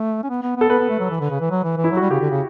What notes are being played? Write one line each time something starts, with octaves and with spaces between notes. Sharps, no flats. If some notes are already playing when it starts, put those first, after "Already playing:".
Already playing: A3
C#4
B3
B3
B3
A4
B3 B4
B3
A3
F#3
E3
D3
C#3
E3
F#3
E3
E3
E4
F#3
G3 F#4
C#3 G4
D3
C#3